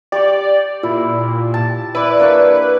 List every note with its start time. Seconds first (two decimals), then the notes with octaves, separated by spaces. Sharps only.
0.12 G4 D5 C#6
0.83 A#2 E4
1.54 A5
1.95 E4 B4 D5
2.19 A#3 D4 C#6